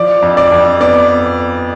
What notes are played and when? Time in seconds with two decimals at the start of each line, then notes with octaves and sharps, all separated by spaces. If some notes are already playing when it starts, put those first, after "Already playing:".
Already playing: F3 D5
0.22 F2
0.37 D5
0.52 F2
0.81 B3 D5